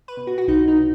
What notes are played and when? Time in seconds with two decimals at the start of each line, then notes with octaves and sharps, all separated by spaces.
0.08 B4
0.17 B2
0.27 F#4
0.38 F#4
0.48 B1 D#4
0.68 D#4
0.78 B2